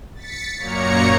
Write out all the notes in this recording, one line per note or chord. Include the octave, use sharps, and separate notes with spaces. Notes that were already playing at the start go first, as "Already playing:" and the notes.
A6 B6 C#7
F#2 A#2 A#3 C#5 A#5 C#7